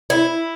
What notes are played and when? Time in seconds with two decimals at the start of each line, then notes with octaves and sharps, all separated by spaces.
0.10 E4